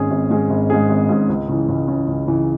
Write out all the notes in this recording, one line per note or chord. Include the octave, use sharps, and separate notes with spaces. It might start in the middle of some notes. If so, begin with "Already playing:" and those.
Already playing: G#1 G#2 G#3 C#4 G#4
G#1
G#2 G#3 C#4 G#4
G#1
G#2 G#3 C#4 G#4
G#1
G#2 G#3 C#4 G#4
C#2
C#3 E3
C#2
C#3 E3
C#2
C#3 E3